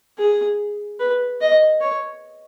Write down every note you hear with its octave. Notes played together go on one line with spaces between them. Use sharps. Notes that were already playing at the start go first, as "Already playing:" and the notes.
G#4
B4
D#5
C#5